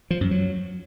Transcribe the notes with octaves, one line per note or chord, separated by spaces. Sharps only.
F3
F#2
F#3